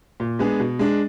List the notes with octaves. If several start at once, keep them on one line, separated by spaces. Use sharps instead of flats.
A#2
G#3 B3 D4 G#4
B2
G#3 D4